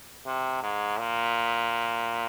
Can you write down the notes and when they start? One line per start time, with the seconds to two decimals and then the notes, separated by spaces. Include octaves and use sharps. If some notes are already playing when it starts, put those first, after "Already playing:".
0.26 C3
0.63 G#2
0.99 A#2